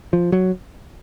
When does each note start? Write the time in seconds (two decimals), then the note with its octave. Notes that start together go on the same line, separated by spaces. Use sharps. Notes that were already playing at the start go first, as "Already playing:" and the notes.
0.13 F3
0.32 F#3